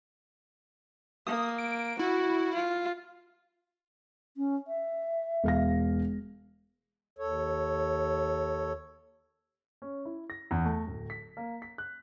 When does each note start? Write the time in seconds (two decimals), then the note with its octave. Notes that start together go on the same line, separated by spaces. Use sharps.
1.27 A#3 D#6
1.58 D7
1.99 E4 F#4
2.54 F4
4.37 C#4
4.67 E5
5.44 E1 F5 A#6
7.18 D#2 A4 C#5
9.82 C#4
10.05 E4
10.30 A#6
10.51 E2
10.64 A3
10.87 D1
11.10 B6
11.37 A#3
11.62 B6
11.78 F#6